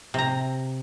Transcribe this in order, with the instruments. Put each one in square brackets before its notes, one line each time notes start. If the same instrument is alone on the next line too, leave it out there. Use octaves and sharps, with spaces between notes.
[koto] C3 A#5